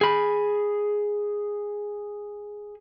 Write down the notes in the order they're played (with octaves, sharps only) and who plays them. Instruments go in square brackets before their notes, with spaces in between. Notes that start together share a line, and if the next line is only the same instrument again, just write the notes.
[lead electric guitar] G#4 B5